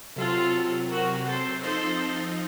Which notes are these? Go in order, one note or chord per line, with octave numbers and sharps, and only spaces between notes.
C3 F#3 C4 F4 A4
F#4 A#4
A4 C5
F3 C4 D#4 A4 C5